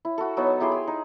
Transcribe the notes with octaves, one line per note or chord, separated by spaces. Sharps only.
E4
F#4 A4
F#3 B3 D#4
E4 G4 G#4 C6
G#4
D#4